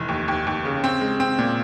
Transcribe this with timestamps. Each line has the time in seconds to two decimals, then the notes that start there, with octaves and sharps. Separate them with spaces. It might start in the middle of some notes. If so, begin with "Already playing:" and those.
Already playing: F1 E3
0.08 D#2
0.28 D#2
0.47 D#2
0.65 C#3
0.84 C4
1.01 G#3
1.20 C4
1.39 A#2